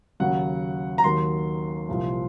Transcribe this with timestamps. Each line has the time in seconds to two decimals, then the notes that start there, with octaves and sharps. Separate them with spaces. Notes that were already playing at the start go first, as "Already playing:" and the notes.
0.20 D#2 C#3 F#3 F#5
0.98 A#5
1.04 D#2 D#3 F#3 C6
1.89 C2 A#2 F3